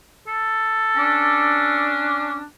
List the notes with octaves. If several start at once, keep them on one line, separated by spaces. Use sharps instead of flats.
A4
C#4 D4